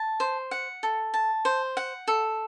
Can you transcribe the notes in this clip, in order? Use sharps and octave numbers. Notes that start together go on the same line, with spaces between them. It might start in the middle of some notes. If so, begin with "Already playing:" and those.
Already playing: A5
C5
F#5
A4
A5
C5
F#5
A4